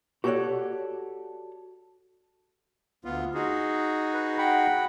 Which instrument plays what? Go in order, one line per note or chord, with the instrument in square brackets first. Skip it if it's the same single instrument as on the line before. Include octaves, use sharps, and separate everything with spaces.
[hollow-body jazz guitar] F#4 G4 A4 C#5 D5 F#5
[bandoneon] D2 B3 F4
D#4 F#4 G#4
[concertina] B4
F#5 G5 B5